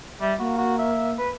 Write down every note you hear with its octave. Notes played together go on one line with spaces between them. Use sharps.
G3 E5
A#3 F#4
F#4
E5
B4